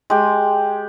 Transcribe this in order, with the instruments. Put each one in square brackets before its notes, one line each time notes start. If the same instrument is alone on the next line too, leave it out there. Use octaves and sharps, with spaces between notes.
[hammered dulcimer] G#3 G4